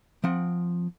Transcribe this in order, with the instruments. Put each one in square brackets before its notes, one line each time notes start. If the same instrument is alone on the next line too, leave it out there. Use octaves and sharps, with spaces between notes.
[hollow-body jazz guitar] F3 C4 F#5